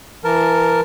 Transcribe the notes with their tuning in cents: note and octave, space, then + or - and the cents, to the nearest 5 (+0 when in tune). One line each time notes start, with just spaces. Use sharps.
E3 +20 A#4 -5 A5 +0